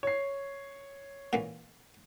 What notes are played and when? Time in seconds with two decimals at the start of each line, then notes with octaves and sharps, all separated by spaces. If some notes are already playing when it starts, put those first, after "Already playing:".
0.03 C#5 C7
1.33 A#2 E3 A#3